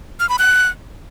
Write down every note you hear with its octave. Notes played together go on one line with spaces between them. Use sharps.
F6
B5
F#6